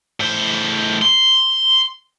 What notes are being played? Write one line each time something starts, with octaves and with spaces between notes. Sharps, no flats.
A2 C5
C6